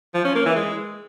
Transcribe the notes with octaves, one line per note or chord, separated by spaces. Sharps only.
F3
C#4
A#3
E3
G#3